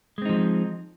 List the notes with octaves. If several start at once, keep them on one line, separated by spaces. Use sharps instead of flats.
F3 G#3 C4 D#4